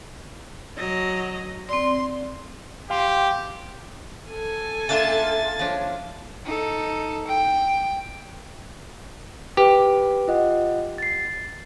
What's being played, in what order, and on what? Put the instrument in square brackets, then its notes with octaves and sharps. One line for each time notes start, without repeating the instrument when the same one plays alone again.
[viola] F#3 D#5
[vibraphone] C4 D5 [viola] C6
[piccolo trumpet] G4 [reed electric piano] F5 G5 C6
[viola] A4 G#5
[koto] A#3 D4 F4 [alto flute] E5 [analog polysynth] A5 A6
[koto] F3 D4 [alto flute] C#5
[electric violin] D#4 A4
G5
[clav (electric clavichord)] G4 [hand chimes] B4
[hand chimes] F4 D#5 F#5
A6 C7